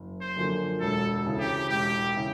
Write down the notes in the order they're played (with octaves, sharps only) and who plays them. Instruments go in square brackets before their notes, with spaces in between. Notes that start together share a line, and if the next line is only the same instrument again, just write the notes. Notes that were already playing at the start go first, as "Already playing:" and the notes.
Already playing: [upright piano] F#1
[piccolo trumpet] C5
[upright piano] F#2 D3 F3 A#3
[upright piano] E1 [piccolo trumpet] A4
[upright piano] D2 C#3 E3
[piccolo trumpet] G4
[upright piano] E1 [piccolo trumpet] G4
[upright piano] C#3 E3